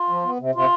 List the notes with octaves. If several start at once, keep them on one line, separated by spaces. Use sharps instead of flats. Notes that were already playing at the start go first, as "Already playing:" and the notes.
Already playing: F4
F3
B3
C3
C3 F4